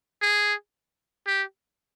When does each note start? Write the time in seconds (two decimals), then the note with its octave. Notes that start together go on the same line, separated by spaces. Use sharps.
0.22 G#4
1.27 G4